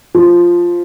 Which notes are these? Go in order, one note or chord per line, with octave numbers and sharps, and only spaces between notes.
F3